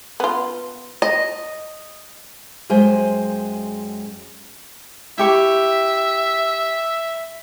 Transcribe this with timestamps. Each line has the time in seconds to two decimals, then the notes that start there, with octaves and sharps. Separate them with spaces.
0.20 B3 F4
1.02 D#5
2.70 F#2 G#3 C5 G5 G#5
5.18 E4 G4 E5 C#6